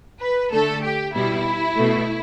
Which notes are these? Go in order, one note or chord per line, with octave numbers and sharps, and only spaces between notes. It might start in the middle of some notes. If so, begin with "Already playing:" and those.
B4
D3 A3 A4
G4
B2 G3 E4
B2 A3